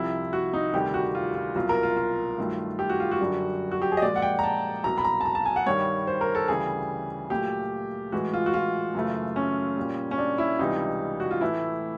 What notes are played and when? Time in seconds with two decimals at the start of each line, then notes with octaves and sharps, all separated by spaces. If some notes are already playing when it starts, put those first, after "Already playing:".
Already playing: C2 C3 F3 E4
0.33 F#4
0.53 D#4
0.74 D2 C3 D#3 G3 G4
0.94 F#4
1.15 F4
1.35 F4
1.56 C2 B2 F#3 F4
1.69 A#4
1.83 F4
1.97 F4
2.38 G2 D#3 F#3 A3
2.79 G4
2.89 F#4
3.00 F4
3.11 F#4
3.20 F#2 D3 G3
3.72 F#4
3.82 G4
3.92 G#4
3.97 D#5
4.02 A#2 F3 G#3 D5
4.16 F#5
4.22 G5
4.39 A#5
4.43 A5
4.84 C2 B2 F#3 A#5
4.98 B5
5.04 A#5
5.21 A5
5.25 A#5
5.35 A5
5.45 G#5
5.56 F#5
5.66 G2 D#3 G3 C#5
6.07 C5
6.21 A#4
6.35 A4
6.48 D2 C#3 E3 G3 G#4
7.30 A#2 F#3 A3 G4
8.12 A2 E3 G#3 F#4
8.33 F4
8.46 F#4
8.54 F4
8.95 F#2 C#3 E3 A3
9.36 C#4
9.77 A#2 G3
10.11 C#4
10.18 D4
10.38 E4
10.59 C#2 C3 E3 G3 D#4
11.20 F#4
11.31 F4
11.41 A2 E3 A3 E4